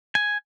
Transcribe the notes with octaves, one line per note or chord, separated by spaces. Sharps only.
G#5